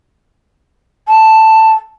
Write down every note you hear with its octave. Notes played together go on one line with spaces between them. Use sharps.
A5